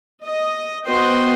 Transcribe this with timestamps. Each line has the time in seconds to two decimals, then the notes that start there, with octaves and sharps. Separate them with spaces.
0.23 D#5
0.88 B3 F#4 C5 D#5 G5 C6